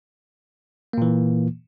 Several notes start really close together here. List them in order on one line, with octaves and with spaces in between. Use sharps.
A#3 A#2 E3